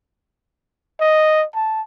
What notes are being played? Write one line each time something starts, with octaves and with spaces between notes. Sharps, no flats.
D#5
A5